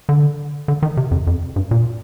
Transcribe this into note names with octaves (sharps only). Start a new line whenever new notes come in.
D3
D3
D#3
C3
F2
F2
G2
A#2